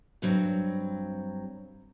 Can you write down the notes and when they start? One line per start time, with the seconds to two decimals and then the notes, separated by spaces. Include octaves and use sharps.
0.22 G2 F#3 C4